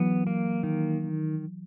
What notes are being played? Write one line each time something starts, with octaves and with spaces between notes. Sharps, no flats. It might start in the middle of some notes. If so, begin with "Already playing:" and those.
Already playing: E3 F#3 B3
A#3
D#3